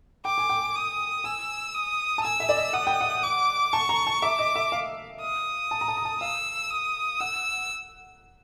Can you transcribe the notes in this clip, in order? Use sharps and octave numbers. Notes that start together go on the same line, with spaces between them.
G5 D6
G#5
G5
D#6
G#5 E6
D#6
A5
G#5 E6
E5
D5
D#5
F#5 D#6
G5
F#5
D6
A5 C#6
A#5
A5
E5 D6
D#5
E5
F5
D#6
A5
A#5
A5
A#5
A5
F5 E6
D#6
F#5 E6